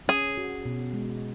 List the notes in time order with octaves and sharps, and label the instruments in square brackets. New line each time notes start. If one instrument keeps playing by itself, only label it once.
[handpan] C#4 [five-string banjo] G#4
[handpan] F#4
B2
G#3